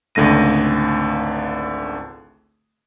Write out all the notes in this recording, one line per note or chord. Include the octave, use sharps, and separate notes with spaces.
G#1 C#2 D3 A3 A#6 D#7